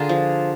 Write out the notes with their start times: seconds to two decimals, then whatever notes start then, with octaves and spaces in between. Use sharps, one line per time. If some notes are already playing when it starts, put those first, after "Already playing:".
Already playing: D3 F4 G#4 A#4
0.09 F3